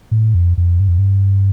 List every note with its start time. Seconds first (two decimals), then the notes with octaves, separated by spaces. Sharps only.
0.11 A2
0.34 F2
0.57 F2
0.80 G2
0.88 F2
0.98 G2